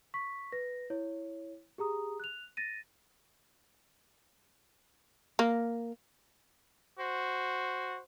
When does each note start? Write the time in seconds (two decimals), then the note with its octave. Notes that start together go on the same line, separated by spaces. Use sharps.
0.14 C#6 B6
0.52 B4 A#6
0.90 E4 C#5
1.78 G4 G#4 A#5 D#6
2.20 F#6 F7
2.57 A6 A#6 D#7
5.39 A#3
6.99 F#4 C5